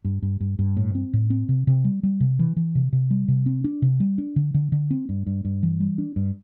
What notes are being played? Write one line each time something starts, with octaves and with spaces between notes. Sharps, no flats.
G2
G2
G2
G2
A2
C4
A2
C4
C3
C3
G3
G3
C3
E3
E3
C3
C3
G3
C3
C4
D4
C3
G3
D4
D3
D3
D3
C4
G2
G2
G2
E3
G3
D4
G2